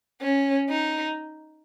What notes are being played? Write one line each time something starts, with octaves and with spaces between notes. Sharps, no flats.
C#4
D#4